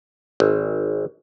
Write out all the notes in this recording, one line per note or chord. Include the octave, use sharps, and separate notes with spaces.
G#1